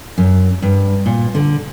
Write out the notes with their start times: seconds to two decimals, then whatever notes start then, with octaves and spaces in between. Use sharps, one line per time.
0.18 F#2
0.62 G2
1.06 A#2
1.35 D3